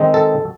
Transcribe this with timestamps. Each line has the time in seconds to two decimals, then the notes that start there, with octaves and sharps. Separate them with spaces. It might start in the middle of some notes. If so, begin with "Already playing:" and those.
Already playing: D#3 G#3 C4 D#4
0.14 A4